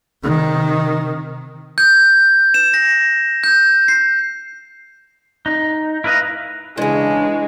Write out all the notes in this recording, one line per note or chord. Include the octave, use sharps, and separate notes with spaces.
C3 D#3
G6
E7
A#6
G6
C7
D#4
E4 A#4 B4 D#5 F5
A#2 C#3 E3 G#3 D4